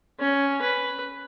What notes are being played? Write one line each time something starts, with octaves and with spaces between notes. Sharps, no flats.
C#4
B4